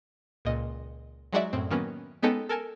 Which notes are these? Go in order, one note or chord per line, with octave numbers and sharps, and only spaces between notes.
C#2 A#2 D#5
F#3 G#3 D#4 F#4 D5 E5
F#2 A2 C4
D#3 F#3 A#3 B3 C#4
G#3 B3 C#4 D#4 A4 G5
A4 A#4 G#5 A5